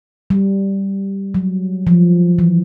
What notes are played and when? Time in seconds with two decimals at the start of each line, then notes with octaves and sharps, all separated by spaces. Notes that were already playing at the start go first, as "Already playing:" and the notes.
0.30 G3
1.35 F#3
1.87 F3
2.39 E3